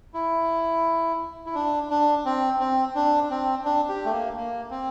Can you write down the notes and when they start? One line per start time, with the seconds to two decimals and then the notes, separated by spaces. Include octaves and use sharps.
0.14 E4
1.46 E4
1.55 D4
1.90 D4
2.25 C4
2.60 C4
2.95 D4
3.30 C4
3.65 D4
3.89 G4
4.05 A3
4.12 A#3
4.36 A#3
4.70 C4